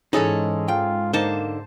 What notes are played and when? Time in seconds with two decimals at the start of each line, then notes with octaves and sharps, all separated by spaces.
0.13 G#2 E3 G#3 C#4 D#4 G#4 A4
0.68 F4 G5
1.13 D3 A#3 D#4 C5 A5